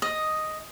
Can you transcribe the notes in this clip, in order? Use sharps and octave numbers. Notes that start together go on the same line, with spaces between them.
D#5